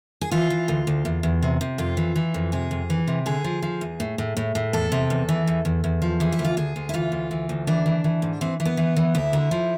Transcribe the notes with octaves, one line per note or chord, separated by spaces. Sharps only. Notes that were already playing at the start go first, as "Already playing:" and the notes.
G#4
E3 F4
E3
D2
D2
E2
E2
C3
C3
F2 F4
E3
E3
F2
C3 G#4
F2
E3
C3
D3 G#4
F3
F3
E2
A2
A2
A2
A2
E2 A4
C3
E2
E3
E2
E2
E2
F3
E3 G#4
E4
D2
F4
D2 G#4
D2
E4
E3 F4
D2
E3
D2
E3 D4
E3
E3
G#2
E3 C4
E3
B3
E3
E3
D2 E4
D3
F3